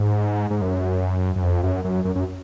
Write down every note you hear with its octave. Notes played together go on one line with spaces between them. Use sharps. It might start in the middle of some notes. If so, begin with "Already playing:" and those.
Already playing: G#2
G#2
F#2
F#2
F2
F#2
F#2
F#2
F#2